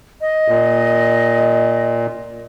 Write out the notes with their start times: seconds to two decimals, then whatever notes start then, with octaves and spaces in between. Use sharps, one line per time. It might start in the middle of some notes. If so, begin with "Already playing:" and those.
0.21 D#5
0.48 A#2